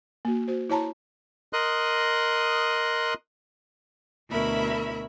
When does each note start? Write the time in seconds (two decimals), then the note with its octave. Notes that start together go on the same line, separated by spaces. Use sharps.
0.25 A#3 F#4
0.48 F#4 C5
0.69 E4 C#5 A5 A#5 C6
1.53 A#4 D#5 C6 D#6 F#6
4.30 D2 B2 E4 A#4 E5 B5